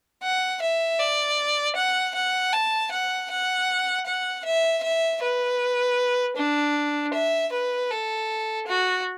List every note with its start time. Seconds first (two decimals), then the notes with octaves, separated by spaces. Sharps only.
0.23 F#5
0.62 E5
1.00 D5
1.76 F#5
2.15 F#5
2.53 A5
2.92 F#5
3.30 F#5
4.07 F#5
4.45 E5
4.83 E5
5.22 B4
6.37 D4
7.14 E5
7.53 B4
7.91 A4
8.67 F#4